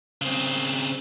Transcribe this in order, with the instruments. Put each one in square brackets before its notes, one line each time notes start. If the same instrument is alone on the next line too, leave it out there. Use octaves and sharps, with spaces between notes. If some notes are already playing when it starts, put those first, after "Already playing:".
[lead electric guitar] C#3 C4